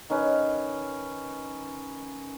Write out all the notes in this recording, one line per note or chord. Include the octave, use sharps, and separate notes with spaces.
D#3 C#4 B4